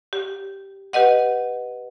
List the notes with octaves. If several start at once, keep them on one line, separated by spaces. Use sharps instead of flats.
G4
G4 B4 D#5 F#5